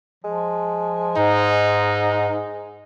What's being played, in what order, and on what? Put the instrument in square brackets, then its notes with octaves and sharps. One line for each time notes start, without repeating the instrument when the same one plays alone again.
[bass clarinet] F3 [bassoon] G#3
[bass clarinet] G#2 [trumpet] D#4